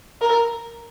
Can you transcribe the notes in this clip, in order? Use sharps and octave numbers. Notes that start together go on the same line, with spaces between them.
A#4